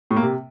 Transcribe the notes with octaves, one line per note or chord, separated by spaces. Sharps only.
A2
A#3
C3